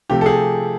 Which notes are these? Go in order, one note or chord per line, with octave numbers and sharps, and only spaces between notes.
C3 F3 A3 G4
A4
G#4